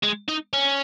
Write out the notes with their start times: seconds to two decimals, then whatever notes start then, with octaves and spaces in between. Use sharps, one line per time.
0.03 G#3
0.29 D#4
0.53 C#4